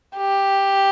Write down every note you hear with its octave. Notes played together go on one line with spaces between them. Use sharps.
G4